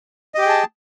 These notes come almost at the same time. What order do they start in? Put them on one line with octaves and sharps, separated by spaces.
D#5 G4 G5 G#4 A5